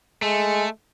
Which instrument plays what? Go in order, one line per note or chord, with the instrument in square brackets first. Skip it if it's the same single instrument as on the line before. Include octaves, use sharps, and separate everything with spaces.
[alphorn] G#3 [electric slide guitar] A3